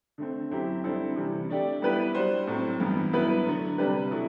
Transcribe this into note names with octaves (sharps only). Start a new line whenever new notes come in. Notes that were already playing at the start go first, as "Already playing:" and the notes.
D3 A3 C4
F#2 F#3 C4 E4 G4
D3 G3 C4 E4 A4
C3 E3 G3
A3 D4 G4 D5
G3 B3 E4 G4 B4
G3 D4 F#4 C5
A2 F#3 C4
G2 E3 B3
G2 F#3 B3 E4 B4
D3 F#3 A3
C3 G3 D4 G4 B4
B2 F#3 A3 E4